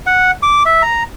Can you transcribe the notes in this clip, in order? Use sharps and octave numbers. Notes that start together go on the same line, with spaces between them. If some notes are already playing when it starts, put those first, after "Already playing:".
F#5
D6
E5
A#5